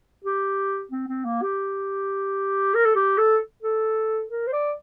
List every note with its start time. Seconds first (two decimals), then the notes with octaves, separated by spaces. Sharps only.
0.25 G4
0.91 C4
1.08 C4
1.25 A#3
1.42 G4
2.75 A#4
2.85 A4
2.95 G4
3.18 A4
3.63 A4
4.30 A#4
4.47 C5
4.53 D5